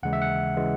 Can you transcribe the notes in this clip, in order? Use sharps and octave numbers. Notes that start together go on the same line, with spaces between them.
D#2 C#3 E3 G#3 F#5
E5
F#5
C#3 E3 G#3